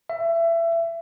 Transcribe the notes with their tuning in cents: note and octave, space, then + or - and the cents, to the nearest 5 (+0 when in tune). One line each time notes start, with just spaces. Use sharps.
E5 +25